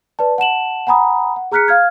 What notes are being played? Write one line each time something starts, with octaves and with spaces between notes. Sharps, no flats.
B4 D5 A5
F#5 A5 E7 F#7
F#5 G#5 A#5 B5 D#6
F#5
G#4 A#5 F6 F#6 B6 C#7
F5 F6 G#6